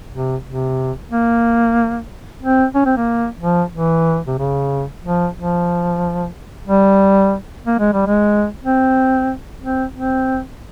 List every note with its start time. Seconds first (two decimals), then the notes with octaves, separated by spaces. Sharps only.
0.13 C3
0.47 C3
1.11 A#3
2.43 C4
2.75 C#4
2.86 C4
2.97 A#3
3.40 F3
3.73 E3
4.27 C3
4.39 C#3
5.04 F3
5.36 F3
6.67 G3
7.66 A#3
7.80 G#3
7.93 G3
8.07 G#3
8.64 C4
9.62 C4
9.94 C4